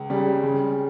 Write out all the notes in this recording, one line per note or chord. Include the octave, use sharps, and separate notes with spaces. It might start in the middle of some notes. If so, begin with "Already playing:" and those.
Already playing: C#2
C#3 G3
C#3